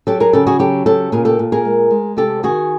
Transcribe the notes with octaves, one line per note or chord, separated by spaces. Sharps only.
F#3 G4 A4
G#4 A#4
C#3 G4 A4
F#4 G#4
F#3 G4 A4
C#3 G4 A4
A#2 G#4 A#4
G4 A4
A#2
G#4 A#4
G#3
G#3
C3 G4 A4
D#3 F#4 G#4